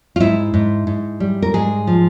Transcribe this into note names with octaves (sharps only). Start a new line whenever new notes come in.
F4
G#2 E4
G#2
G#2
G3
A#4
G#2 G#4
F3